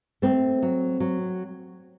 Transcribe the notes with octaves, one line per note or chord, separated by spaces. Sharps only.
A3 C4
F#3
F#3